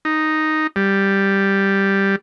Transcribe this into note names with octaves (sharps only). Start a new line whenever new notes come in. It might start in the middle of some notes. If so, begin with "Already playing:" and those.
D#4
G3